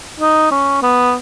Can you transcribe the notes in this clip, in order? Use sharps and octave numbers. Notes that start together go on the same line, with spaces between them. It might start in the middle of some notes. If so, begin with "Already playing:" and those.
D#4
C#4
B3